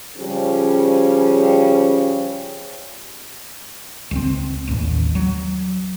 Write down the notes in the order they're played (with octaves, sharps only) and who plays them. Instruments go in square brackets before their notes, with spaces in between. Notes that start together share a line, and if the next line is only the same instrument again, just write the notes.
[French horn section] C#3 F3 G3 C#4
[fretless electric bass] C#2 F3 C4
A1 D#2
F#3